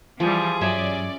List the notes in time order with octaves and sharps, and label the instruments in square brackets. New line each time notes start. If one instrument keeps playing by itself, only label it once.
[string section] E3 G3 [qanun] F3 [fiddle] G#4
[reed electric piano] G2 F#3 G#6 [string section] C#4 D5 [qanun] E5